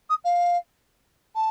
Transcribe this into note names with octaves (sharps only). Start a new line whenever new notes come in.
D#6
F5
A5